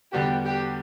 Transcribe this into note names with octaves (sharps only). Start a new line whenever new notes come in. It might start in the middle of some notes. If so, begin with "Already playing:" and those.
E2 D3 G3 B3 F#4 G4
G4